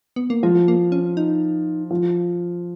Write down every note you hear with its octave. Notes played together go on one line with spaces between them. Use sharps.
B3
A#3
F3 G#3
A#3
C#4
D#4
F3